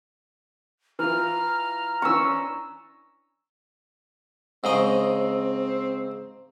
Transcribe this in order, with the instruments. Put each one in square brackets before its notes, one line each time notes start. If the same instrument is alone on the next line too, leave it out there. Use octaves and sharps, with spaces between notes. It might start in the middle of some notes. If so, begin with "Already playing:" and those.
[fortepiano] E3 F4 [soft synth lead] A#5 [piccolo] F6
[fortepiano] E3 C#4 D4 [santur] C#6 E6
[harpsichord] G#2 C#3 D#5 [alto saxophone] C4